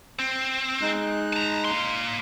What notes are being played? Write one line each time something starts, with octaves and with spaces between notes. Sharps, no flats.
C4
G#3 D#4 F#6
A5 A#5
A#3 C6